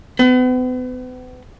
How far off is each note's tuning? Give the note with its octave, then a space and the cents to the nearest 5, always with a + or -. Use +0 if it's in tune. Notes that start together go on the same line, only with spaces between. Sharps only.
B3 +40